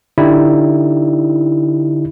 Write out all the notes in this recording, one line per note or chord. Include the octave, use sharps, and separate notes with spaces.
D3 D#4 E4 G4 D5